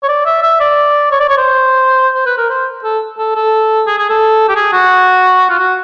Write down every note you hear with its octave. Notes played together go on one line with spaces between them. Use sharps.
C#5
D5
E5
E5
D5
C#5
D5
C#5
C5
C5
B4
A#4
C5
A4
A4
A4
G#4
G#4
A4
G4
G#4
F#4
F4
F#4